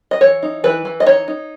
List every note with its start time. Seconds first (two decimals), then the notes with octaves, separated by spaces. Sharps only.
0.11 D#5
0.21 E3 C#5
0.43 D#4
0.64 E3 B4
0.85 E3
1.00 D#5
1.06 D#4 C#5
1.28 D#4